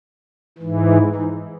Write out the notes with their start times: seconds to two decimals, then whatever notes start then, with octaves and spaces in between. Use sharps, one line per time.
0.58 G#2 E3
1.15 D#4